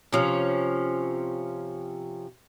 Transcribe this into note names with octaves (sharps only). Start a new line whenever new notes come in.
C3 F3 C#4